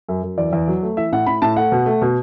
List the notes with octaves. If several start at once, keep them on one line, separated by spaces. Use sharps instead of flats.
F#2
F#2
E2 D5
E2
F#3
A3
E3 E5
A2 F#5
A2 B5
A2 A5
A3 F#5
B2
A3
B2